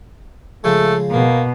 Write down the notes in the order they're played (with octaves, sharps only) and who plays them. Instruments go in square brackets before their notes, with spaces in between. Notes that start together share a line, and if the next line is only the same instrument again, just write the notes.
[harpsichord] C#3 F3 G#3 [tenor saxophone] A3
[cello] B2 [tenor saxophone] A#3